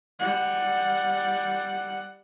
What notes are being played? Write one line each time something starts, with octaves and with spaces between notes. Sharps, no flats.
G3 F#5